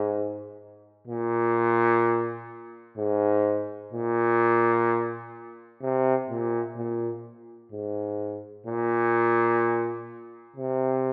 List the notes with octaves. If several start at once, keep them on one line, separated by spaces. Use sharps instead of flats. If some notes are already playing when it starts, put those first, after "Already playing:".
Already playing: G#2
A#2
G#2
A#2
C3
A#2
A#2
G#2
A#2
C3